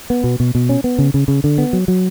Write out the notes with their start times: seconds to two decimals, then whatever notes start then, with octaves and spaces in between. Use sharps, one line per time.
0.10 B3
0.24 B2
0.40 B2
0.55 B2
0.69 C#4
0.84 B3
0.99 C#3
1.14 C#3
1.28 C#3
1.44 D3
1.58 B3
1.73 F#3
1.88 F#3